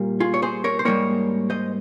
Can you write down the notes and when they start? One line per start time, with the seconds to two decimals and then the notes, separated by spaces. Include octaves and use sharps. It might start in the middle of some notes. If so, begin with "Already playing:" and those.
Already playing: A#2 G3 A#3
0.20 F4 G#4
0.34 C#5
0.42 G#4 C5
0.64 A#4 C#5
0.79 C5
0.85 G#2 G3 A#3 A#4 C#5
1.50 C5 D#5